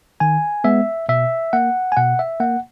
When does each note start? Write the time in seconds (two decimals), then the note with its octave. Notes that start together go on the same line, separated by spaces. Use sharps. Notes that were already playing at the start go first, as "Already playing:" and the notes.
0.20 D#3 G#5
0.64 G#3 B3 E5
1.09 B2 E5
1.53 A#3 F#5
1.92 G#5
1.97 B2 F#5
2.19 E5
2.40 A#3 F#5